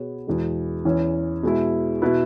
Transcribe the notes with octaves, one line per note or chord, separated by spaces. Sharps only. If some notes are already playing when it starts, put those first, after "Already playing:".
Already playing: B2 B3 G#4 C#5
E2 B2 G#3
E2 E3 C#4
B2 G#3 E4
B2 B3 E4 B4